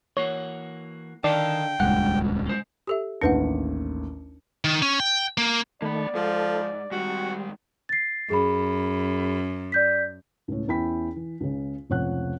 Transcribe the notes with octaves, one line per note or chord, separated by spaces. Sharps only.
E3 A#3 F#4 C#5
D3 D#3 D5 F5 G5 A5
D#1 C#2 G2 G#3 F#5
G#3 C5
G4 A4 E5
A1 D#2 D4 B4 F#5 C#7
D#3
C#4
G5
A#3
D#3 A3 A#3 D5 B5
G#2 F3 A4
G#2 D#3 G3 F#4
A6 C7
F#2 G#4 B5
D5 G6 B6
C#2 A2
E2 C#4 E4 G5 B5 B6
E3
C#2 C#3
F1 C#2 F3 C#5 F#5 F#6